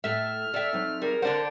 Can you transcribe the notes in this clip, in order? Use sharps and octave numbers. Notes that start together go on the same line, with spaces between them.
A2 A4 E5 F6
A4 D5 E5 G5
F#3 C4 D#4
G3 G#4 A#4
D3 D4 C5 F#5